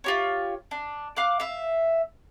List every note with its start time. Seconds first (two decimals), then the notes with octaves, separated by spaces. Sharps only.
0.04 F4 G4 C#5
0.71 D4
1.17 F5 D6 F#6
1.40 E5 F5